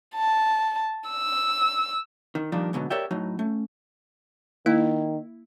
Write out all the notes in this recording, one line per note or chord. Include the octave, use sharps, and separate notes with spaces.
A5
E6
D#3
G2 A#2 D#3 F3 A#3 D4
G#2 B2 D3 F#3
G4 A#4 C#5 D5 E5 G5
A2 F#3 D#4
A3 C#4
D#3 A#3 E4